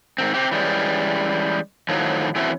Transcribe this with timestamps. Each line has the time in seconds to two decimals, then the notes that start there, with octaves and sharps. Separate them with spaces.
0.18 G#2 D#3 C4
0.34 C4 G4
0.52 E3 G3 G#3 C#4
1.89 A2 D#3 F3 F#3
2.36 E3 A3 C4 C#4 E4 F#4